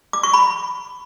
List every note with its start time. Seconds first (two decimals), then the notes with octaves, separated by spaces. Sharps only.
0.13 D6
0.23 C#6
0.33 B5